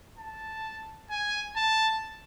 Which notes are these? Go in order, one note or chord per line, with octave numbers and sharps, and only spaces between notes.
A5
G#5
A5